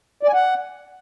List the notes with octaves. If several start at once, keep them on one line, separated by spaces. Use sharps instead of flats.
D5
G#5
F#5